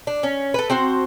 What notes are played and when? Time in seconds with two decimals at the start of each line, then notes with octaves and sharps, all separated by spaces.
0.07 D4
0.23 C#4
0.54 A4 B4
0.70 C4 F#4 C5 A5